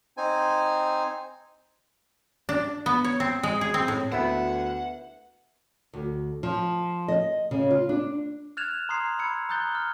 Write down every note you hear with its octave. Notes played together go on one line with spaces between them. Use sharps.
C4 D#4 C5 G#5
D4
B3
C#5
C4
G#3
G#4
C4
A2
D2 B3 E4 B4 E5 F#5
D2
F3
D#5
C#3
F4
D4
F6 F#6 G#6 A6 E7 F7
A#5 C6 D#6 G#6 C7
B5 E6 G#6 C#7
A#5 D#6 F#6 G6 A6 G7
F6 A6